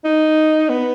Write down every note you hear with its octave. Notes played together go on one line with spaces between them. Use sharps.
D#4
B3